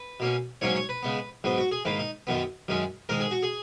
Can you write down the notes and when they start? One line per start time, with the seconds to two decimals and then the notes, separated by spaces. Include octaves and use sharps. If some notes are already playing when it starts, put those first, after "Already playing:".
Already playing: B4
0.20 B2 A#3 C#4
0.61 G#2 F#3 A#3 C#4 C#5
0.75 C#5
0.89 B4
1.03 C#3 G#3 B3
1.44 G#2 F#3 B3
1.58 F#4
1.72 G#4
1.85 G#2 D#3 A#3 B4
1.99 D#4
2.27 F#2 D#3 F#3 B3
2.68 F#2 D#3 G#3 C#4
3.09 G#2 D#3 G#3 A#4
3.20 G#4
3.31 F#4
3.43 G#4